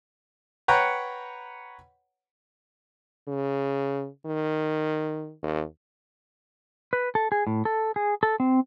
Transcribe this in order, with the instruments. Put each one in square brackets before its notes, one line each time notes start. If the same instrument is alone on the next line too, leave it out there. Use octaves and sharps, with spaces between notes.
[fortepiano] B4 C#5 F#5 G5 A#5 B5
[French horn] C#3
D#3
D#2
[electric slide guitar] B4
A4
G#4
A2
A4
G#4
A4
C4